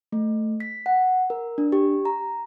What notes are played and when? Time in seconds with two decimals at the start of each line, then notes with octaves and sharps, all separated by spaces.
0.12 A3
0.60 B6
0.86 F#5
1.30 A#4
1.58 D4
1.72 G4
2.05 A#5